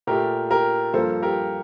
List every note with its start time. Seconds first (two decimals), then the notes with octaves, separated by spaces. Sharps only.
0.07 A#2 A3 G4 A#4
0.50 G4 A#4
0.94 G2 F3 A#3 A4 C5
1.23 G4 A#4